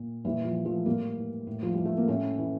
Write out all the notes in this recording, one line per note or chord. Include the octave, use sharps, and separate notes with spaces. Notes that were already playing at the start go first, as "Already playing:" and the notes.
Already playing: A#2
A#2 E3 G3
F3
F3 A3
A2 G3 A#3
E3
A2
F3
E3 G3
A3
A#3
A2 A3 C#4
E3